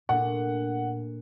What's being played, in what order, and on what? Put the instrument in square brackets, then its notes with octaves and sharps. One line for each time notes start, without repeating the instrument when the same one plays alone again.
[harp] A#2 A3 D4 [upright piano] F#5